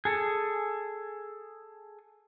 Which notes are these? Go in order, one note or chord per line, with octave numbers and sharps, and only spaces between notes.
G#4 A4